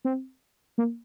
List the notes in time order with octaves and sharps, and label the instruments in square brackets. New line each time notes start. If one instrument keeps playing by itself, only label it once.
[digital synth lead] C4
A#3